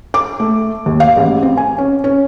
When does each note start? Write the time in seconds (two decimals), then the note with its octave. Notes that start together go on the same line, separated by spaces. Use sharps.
0.14 D6
0.40 A3
0.86 D#2
1.00 F5
1.16 A1
1.43 C4
1.57 G#5
1.78 C#4
2.04 C#4